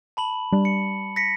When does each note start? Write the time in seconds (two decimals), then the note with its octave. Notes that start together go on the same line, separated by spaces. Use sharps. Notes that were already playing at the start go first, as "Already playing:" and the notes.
0.17 A5 B5 F#7
0.52 G3 D4
0.65 C#7
1.16 A#6 B6 C#7